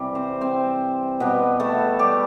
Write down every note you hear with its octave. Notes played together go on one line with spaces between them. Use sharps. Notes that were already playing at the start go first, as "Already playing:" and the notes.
Already playing: C3 E3 G3
C4 C5
C4 C5
B2 G3 B3 B4
A3 A4
G3 G4